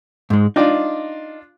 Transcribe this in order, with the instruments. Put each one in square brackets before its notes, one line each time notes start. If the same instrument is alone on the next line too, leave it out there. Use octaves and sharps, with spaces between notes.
[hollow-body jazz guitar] G#2 G#3
[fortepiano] D4 F4 D5 [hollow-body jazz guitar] D#4